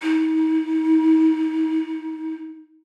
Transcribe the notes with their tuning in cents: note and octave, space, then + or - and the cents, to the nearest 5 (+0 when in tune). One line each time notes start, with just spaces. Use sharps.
D#4 +35